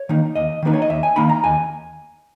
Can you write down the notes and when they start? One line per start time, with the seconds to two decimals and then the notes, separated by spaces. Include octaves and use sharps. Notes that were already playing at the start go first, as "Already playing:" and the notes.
Already playing: C#5
0.09 D#3 A#3 D#4
0.35 D#2 D#5
0.62 D#3 A#3 D#4 B4
0.73 C#5
0.82 D#5
0.90 D#2 E5
1.03 G#5
1.16 D#3 A#3 D#4 B5
1.29 A#5
1.44 D#2 G#5